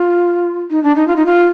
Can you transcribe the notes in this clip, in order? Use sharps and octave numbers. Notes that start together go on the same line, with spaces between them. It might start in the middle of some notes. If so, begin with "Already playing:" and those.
Already playing: F4
D#4
D4
D#4
F4
D#4
F4